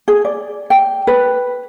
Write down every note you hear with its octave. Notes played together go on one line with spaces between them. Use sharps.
G#4
D5
G5
B4